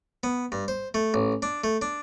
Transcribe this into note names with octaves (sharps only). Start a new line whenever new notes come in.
B3
G2
C5
A3
A1
D4
A3
D4